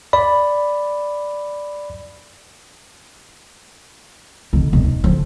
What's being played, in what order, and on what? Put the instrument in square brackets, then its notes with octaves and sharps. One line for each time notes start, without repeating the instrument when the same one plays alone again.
[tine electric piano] D5 B5
[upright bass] D3 D#4
E1
D#4
D3 F3